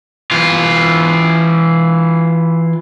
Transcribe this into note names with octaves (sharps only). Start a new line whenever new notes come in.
E3 F4